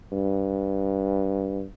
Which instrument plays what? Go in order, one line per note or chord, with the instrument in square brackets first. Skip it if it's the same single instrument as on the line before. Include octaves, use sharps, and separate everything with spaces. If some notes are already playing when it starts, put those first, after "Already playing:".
[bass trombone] G2